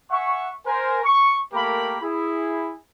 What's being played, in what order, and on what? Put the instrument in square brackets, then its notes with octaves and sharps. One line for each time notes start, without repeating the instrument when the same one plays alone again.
[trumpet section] E5 F#5 G#5 C#6
A#4 C5 G#5
C#6
A3 A#3 G4 A#4 F5 B5
E4 G#4